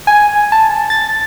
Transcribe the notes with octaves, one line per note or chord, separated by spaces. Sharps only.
G#5
A5
A6